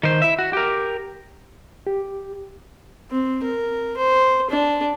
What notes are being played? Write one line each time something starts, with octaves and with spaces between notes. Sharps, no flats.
D#3 C5
E4 E5
F#4
G4 A#4
G4
C4
A#4
C5
D4